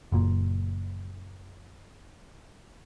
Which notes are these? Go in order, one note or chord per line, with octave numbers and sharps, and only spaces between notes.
F#1 A#2